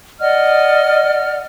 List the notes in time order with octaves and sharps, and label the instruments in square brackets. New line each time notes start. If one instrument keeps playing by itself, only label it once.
[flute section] D5 D#5 F#5 F6